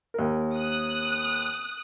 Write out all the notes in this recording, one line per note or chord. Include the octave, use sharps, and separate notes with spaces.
D#2 A#4
D#6 F#6